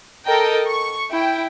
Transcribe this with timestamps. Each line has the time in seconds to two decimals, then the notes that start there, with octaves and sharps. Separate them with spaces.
0.25 A4 A#4 D#5 G5
0.68 C#6
1.11 E4 G5